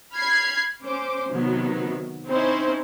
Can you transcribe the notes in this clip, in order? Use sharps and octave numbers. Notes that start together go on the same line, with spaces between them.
B5 F6 G#6 C7
C#4 C5 D6
C3 D#3 F#3 B3
C4 C#4 D#4 E4 C5